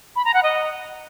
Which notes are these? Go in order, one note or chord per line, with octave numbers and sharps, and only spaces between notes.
B5
A#5
F#5
D#5